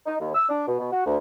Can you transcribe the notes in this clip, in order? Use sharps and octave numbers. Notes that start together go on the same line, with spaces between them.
D#4
D#2
E6
D4
B2
B2
F#4
D2